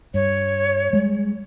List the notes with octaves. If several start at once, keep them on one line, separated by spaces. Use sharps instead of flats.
G2 C#5
G3 G#3